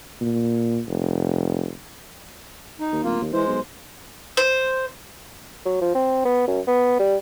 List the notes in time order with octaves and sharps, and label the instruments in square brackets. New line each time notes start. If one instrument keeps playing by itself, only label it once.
[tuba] A#2
F1
[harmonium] D#4
[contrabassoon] D#2
[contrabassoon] D1 [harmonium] A#3 F4
[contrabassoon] D#2
[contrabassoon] E3 [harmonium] G#3 C5
[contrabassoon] B1
[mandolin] C5
[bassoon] F#3
F3
C4
B3
F#2
B3
G3